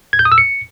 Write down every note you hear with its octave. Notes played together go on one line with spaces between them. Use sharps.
G#6
G6
D#6
E6
C#7